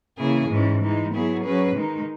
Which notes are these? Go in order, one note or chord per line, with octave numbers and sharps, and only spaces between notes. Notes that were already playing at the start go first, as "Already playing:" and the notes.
C#3 E3 A#3 E4 G#4
G#2 E3 G#3 C#4
E3 G#3 D#4
F#3 B3 E4 G#4
F#3 C#4 G#4 B4
D#3 G#3 D#4